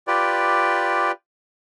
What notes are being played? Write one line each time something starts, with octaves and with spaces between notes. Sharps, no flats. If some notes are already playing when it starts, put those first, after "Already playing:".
F4 G4 B4 D5